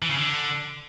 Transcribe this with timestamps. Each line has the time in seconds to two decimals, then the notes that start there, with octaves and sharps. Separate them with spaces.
0.02 E3
0.10 C#3
0.17 D3